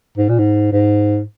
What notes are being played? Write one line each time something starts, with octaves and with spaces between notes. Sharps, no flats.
G#2
A#2
G#2
G#2